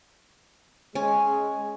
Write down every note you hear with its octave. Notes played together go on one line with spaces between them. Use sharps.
G#3 C#4